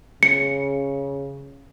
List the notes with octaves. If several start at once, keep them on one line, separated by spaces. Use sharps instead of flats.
C#3 C#7